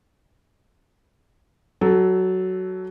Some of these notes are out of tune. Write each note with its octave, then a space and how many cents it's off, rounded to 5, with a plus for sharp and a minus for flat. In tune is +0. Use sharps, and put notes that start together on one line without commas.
F#3 +10 A4 -5